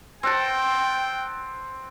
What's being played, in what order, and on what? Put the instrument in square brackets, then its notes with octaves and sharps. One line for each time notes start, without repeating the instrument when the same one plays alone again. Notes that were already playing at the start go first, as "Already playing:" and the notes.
[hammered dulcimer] C4 F#5 A5 [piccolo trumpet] G5